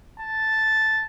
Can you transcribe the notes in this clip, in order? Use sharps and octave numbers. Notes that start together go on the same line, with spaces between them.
A5